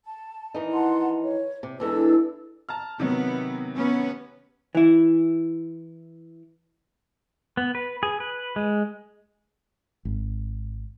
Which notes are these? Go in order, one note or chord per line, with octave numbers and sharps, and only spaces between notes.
A5
D#3 E3 D#4
F#5 A5 C6
C#5
C3
E2 E3 G#3 D4 A4 E6
A5 A#5 F6
C3 D#3 F#3 B3
B3 C#4
E3 E4
B3
B4
G#4
B4
G#3
G#1